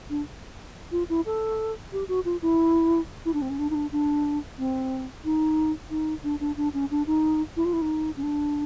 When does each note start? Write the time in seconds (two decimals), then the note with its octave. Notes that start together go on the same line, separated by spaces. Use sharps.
0.10 D4
0.92 F4
1.09 E4
1.26 A4
1.93 G4
2.08 F#4
2.25 F4
2.42 E4
3.25 E4
3.34 D4
3.42 C4
3.50 C#4
3.59 D4
3.70 D#4
3.75 D4
3.92 D4
4.58 C4
5.25 D#4
5.90 D#4
6.24 D4
6.40 D4
6.57 D4
6.74 C#4
6.91 D4
7.07 D#4
7.57 E4
7.65 F4
7.73 E4
7.82 D#4
8.17 C#4
8.23 D4